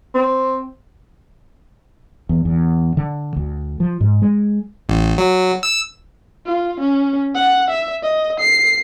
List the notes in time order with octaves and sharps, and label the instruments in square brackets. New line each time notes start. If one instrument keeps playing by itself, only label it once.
[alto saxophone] C4
[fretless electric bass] E2
E2
D3
D2
F3
G#2
G#3
[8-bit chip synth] A1
F#3
E6
[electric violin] F4
C#4
F#5
E5
D#5
C7